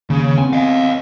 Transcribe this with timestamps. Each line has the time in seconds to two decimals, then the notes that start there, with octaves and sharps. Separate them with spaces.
0.10 D#2 C#3
0.38 B3 C4 G#5
0.53 D#5 F5